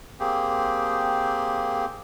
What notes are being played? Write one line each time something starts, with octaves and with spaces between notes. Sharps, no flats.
A#3 C4 G4 G#4